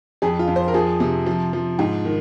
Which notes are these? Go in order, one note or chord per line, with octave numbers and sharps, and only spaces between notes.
F2 G#4
F4
F2
C5
A#4
F3 G#4
C3
F3
F3
G#2
D#3